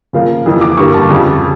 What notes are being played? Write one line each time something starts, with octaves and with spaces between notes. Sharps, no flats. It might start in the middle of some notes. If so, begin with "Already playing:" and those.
C#3 F3 A#3 F5
F2 E3 A#3
D6
G2 D3 G3 A#3 C#6
A5
F2 C#3 G3